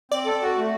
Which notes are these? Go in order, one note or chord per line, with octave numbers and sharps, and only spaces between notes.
C4 D5
A4
F#4
A3